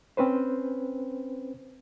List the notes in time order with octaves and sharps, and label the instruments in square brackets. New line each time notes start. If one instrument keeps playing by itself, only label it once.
[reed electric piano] C4 C#4 B4 C5